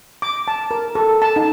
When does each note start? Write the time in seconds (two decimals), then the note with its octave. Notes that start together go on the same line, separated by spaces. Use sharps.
0.22 D6
0.48 A5
0.71 A#4
0.95 A4
1.22 A5
1.36 D#4